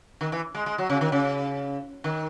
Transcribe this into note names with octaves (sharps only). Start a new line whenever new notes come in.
D#3
E3
G#3
G#3
F#3
C#3
D#3
C#3
D#3